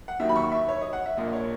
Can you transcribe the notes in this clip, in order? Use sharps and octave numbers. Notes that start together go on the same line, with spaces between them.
F#5
D#2 D#3 F#3 E5
B5
C#6
E5
C#5
D#5
F#5
E5
A#1 A#2 A#3 D#5
C#5